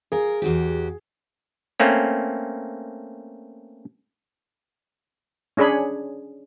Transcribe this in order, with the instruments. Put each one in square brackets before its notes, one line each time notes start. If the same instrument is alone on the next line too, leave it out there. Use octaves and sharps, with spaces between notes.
[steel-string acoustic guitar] F4 A#4 [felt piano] G#4
[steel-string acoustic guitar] E2 F#4 G4
[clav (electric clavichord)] A3 A#3 C4 C#4
[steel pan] C#4 D4 G#4 C#5 B5